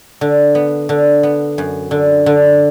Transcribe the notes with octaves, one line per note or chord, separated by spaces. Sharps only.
D3
B3
D3
B3
F#2
D3
D3